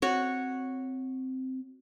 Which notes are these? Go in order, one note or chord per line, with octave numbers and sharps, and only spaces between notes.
C4 F#4 C#5 F#5